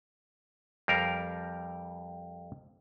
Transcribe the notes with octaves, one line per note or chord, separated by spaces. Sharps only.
F2 G3 A#4 F5